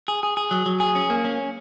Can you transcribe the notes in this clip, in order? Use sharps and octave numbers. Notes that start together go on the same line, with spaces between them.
G#4
G#4
G#4
F#3
F#3
G#4
C#4
A#3
C#4